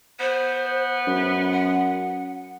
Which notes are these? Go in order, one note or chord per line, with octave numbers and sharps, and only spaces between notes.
B3 C5
F#2
F#5